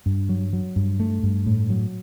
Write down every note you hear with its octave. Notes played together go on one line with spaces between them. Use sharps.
G2
F#3
F#3
G2
A3
G2
A2
F#3